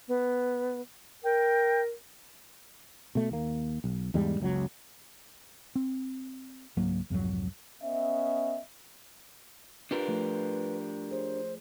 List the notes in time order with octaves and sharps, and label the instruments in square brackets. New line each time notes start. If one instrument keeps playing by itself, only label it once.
[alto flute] B3
[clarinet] A#4 [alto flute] G5
[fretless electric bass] B2 A3
D#2 A#3
B1
E2 G#2 G3 G#3
F#1 C#2 B2 F#3
C4
C#2 G#2 F#3 A#3
C2 F2 G#2 F#3
[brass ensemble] B3 C#4 D#5 E5
[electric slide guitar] D4 G4 A#4 [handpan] F4 [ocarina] B4
[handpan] F3 A3
[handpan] G#4 C#5 [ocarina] C5